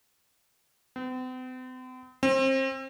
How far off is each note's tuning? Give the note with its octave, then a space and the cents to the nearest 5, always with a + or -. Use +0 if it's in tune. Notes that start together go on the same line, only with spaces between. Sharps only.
C4 -45
C4 +30